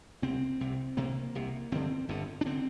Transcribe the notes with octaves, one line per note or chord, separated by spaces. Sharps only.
C2 C3 C4
C2 C3
C2 C3 A#3
C2 C3
G1 G2 D3 C4
G1 G2 D3
D4
D3 C4